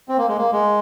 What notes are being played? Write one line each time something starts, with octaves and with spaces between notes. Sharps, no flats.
C4
A#3
G#3
A#3
G#3